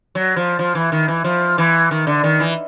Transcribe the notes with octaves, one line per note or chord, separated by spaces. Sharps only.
F#3
F3
F3
E3
D#3
E3
F3
E3
D#3
D3
D#3
E3